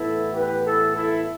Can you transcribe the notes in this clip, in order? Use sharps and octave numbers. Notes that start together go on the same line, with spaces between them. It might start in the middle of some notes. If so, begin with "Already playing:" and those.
Already playing: A2 E3 B3 E4 A4
G4 B4
E4 A4
E4 A4